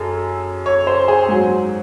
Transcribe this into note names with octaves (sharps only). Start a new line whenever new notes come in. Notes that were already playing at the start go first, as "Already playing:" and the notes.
Already playing: F#2 G#4 A4
C#5
C5
G#4
G#2 F#3